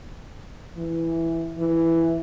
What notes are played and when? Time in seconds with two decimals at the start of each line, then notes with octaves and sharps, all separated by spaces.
0.77 E3
1.58 E3